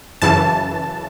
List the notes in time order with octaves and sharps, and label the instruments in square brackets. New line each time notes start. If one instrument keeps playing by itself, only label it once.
[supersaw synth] F#2 C#3 E3 A5